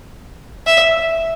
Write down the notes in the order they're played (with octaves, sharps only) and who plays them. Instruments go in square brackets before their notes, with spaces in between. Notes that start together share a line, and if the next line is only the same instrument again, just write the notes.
[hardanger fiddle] E5